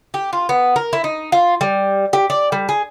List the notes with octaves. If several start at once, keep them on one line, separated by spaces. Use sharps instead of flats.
G4
F4
B3
A#4
E4
D#4
F4
G3
G4
D5
G3
G#4